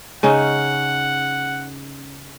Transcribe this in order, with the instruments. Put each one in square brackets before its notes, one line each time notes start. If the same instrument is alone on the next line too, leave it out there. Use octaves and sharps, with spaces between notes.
[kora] C#3 C#4 D#4 [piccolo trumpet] F#5